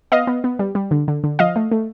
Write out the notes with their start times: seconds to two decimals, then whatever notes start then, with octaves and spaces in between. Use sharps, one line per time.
0.12 B3 D#5 F5
0.27 B3
0.44 B3
0.59 G3
0.75 G3
0.91 D3
1.08 D3
1.24 D3
1.39 F3 D#5 F5
1.56 A3
1.71 A3